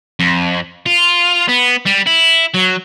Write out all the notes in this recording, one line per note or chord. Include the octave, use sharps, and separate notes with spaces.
F2
F4
B3
G3
E4
F#3